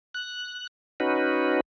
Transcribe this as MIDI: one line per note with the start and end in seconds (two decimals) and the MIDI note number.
0.14 0.67 90
1.00 1.60 61
1.00 1.60 63
1.00 1.60 66
1.00 1.60 71